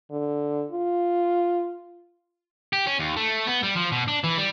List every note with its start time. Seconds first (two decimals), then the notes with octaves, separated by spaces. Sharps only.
0.11 D3
0.72 F4
2.73 G4
2.87 C#4
2.99 D#2
3.16 A3
3.47 B3
3.63 G3
3.76 F3
3.92 B2
4.08 D4
4.24 E3
4.38 G3